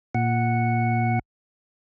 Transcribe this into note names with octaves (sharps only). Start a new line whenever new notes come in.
A#2 F#5